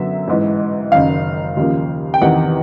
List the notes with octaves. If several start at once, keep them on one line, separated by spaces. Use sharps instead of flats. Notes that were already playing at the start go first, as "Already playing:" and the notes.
Already playing: F#2 D3 F#3 B3 E5
A1 G#2 E3
F#1 F#2 D#3 F5
D#2 C#3 F3 A#3
G5
E2 C3 D#3 F#5